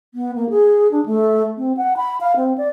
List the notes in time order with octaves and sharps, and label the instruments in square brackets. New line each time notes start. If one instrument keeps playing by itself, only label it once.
[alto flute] B3
A#3
G#4
D4
A3
C4
F#5
B5
F5
C4
D5